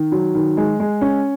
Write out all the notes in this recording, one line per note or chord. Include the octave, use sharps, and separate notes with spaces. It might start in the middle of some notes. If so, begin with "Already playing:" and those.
Already playing: D#3
F#3
D#3
G#3
G#3
C#4